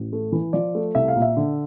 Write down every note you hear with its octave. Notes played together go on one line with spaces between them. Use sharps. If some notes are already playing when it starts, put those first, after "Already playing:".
Already playing: A1
A3
E3
F3 D5
A3
C2 E5
F5
A#2
E5
D3